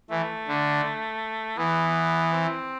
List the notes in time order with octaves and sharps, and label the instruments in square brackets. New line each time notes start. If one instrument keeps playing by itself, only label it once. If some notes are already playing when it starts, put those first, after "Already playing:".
[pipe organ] E3 [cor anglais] A3
[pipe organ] D3
[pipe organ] E3 [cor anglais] B3
[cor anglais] C4